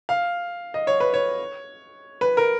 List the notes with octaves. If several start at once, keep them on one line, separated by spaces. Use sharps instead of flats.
F5
D#5
C#5
B4
C#5
B4
A#4